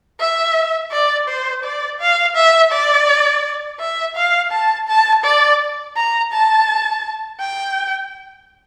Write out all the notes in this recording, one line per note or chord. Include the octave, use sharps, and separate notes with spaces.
E5
D5
C5
D5
F5
E5
D5
E5
F5
A5
A5
D5
A#5
A5
G5